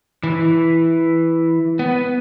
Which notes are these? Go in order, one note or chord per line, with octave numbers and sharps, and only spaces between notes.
E3
B3